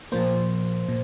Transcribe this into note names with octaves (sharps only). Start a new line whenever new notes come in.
A#2 F3 A#3 C5
A#2